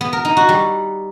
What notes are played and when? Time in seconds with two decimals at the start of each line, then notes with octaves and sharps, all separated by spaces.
0.01 B3
0.13 A#4
0.25 D#4
0.37 F#4
0.49 G3